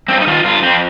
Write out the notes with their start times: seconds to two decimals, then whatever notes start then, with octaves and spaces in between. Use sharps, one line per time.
0.08 G2 C4
0.21 D#4
0.27 D#3 F4
0.44 G2 F4
0.62 F2 C4